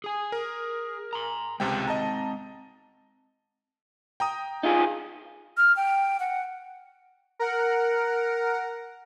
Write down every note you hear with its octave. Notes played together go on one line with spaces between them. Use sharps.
G#4 G#5
A#4
A#5 C6
C#2 C3 G#3 C4 G5
D#5 A5 A#5
G5 A#5 D#6
D#4 F4 G#4
F6
G5
F#5
A#4 F#5